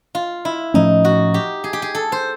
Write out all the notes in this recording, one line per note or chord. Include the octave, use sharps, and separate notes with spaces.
F4
E4
A2 F3 A3 C#4 D#4
F#4
G4
G#4
G4
G#4
A4
C5